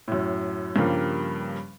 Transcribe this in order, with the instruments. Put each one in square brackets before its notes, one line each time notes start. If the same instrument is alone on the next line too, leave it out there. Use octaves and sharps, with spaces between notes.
[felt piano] F#2 A2
G2 C#3 F3 G3 A#3